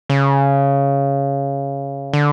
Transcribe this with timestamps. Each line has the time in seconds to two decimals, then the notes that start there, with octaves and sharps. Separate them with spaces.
0.10 C#3
2.13 D3